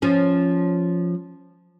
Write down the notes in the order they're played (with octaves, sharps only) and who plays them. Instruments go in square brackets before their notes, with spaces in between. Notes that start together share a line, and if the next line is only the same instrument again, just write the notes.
[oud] F3 C#4